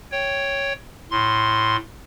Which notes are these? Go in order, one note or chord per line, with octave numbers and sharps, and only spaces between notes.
C#5 G5
A2 C6